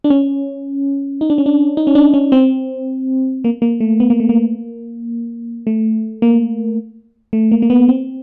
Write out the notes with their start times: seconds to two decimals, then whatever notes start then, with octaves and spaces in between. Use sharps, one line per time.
0.04 D4
0.10 C#4
1.21 D#4
1.30 D4
1.38 C#4
1.46 D4
1.77 D#4
1.87 C#4
1.95 D4
2.14 C#4
2.32 C4
3.44 A#3
3.62 A#3
3.80 A3
4.00 B3
4.10 A#3
4.20 A3
4.29 A#3
5.67 A3
6.22 A#3
7.33 A3
7.52 A#3
7.62 A#3
7.70 B3
7.89 C4